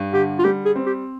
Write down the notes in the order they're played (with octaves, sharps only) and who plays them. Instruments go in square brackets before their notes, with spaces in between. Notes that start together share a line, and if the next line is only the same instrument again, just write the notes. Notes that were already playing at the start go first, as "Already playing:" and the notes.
Already playing: [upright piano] G2
[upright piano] D3 [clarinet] G4
[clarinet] F4
[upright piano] G3 [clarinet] G4
[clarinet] G#4
[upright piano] C4
[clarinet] G4